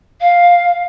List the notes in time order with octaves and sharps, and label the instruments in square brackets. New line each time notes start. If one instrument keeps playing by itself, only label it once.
[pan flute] F5